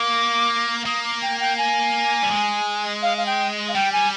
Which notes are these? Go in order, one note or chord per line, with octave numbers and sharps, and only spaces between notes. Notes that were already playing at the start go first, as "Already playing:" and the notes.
Already playing: A#3 D6
A#3 D#6
D6
G5
G5
G#5
G3
G#3
F5
F5
G5
F5
G3 G5
G#5